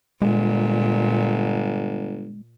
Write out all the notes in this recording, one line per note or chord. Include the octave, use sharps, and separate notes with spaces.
G1 A#2 G#3